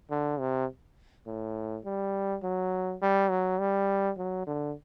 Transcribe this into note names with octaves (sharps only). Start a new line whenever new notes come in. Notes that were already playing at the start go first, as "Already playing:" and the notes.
D3
C3
A2
G3
F#3
G3
F#3
G3
F#3
D3